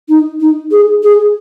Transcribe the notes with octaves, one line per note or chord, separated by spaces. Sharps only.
D#4
D#4
G#4
G#4